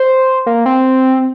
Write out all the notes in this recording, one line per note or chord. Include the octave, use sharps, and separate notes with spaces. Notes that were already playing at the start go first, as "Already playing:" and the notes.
Already playing: C5
A#3
C4